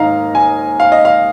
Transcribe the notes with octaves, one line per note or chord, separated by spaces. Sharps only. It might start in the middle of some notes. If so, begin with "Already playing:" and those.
Already playing: G#2 D#3 A#3 D#5 F5 A#5
G#5
F5
D#5
F5